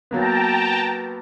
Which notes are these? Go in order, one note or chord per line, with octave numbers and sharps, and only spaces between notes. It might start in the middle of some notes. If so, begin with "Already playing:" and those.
F#3 A#3 B3 G5 A5 A#5